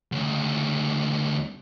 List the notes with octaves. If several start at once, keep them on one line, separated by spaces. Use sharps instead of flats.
D2 C#3